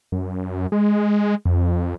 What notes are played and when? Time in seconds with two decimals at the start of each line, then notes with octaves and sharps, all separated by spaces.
0.12 F#2
0.72 G#3
1.45 F2